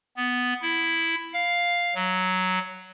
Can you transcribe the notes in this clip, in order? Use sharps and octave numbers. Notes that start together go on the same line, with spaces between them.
B3
E4
F5
F#3